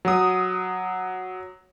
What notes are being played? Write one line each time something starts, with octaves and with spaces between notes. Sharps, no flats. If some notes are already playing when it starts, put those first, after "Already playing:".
F#3 D#6